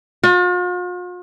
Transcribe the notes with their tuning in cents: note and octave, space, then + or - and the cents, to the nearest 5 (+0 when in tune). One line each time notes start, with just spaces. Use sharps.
F4 +45